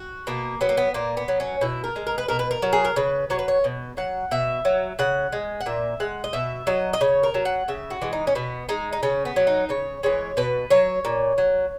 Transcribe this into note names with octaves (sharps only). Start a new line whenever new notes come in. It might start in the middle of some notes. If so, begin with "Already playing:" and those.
Already playing: F#4
B2 A#3
F#3 B3
A#3
B3
A#2 A#3
B3
F#3
C#4
B2 E4
A#4
G#3
A#4
B4
B2 A#4
B4
A#4
F#3
G#4
A#4
C#3 B4
F#3 C#5
B4
C#5
B2
F#3 F#5
B2 E5
F#3
C#3 F#5
G#3
F#5
A#2 E5
G#3 F#5
D#5
B2 E5
F#3 D#5
D#5
C#3 C#5
A#4
F#3
F#5
C#3 E5
F#4
E3 G#3
D#4
C#4
B2 B3
G#3 D#4
D#4
C#3 C#4
B3
F#3
D#4
C#3 C#5
E3 G#3 C#5
B2 B4
F#3 C#5
A#2
F#3